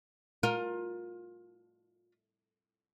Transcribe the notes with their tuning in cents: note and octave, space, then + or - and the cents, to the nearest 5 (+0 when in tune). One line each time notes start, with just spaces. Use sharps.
F4 +25 A#4 +10